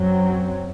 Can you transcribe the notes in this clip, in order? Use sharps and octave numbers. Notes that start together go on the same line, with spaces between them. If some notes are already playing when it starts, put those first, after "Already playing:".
Already playing: F#2 F#3 C4